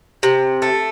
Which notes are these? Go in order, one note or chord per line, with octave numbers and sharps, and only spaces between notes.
C3
A3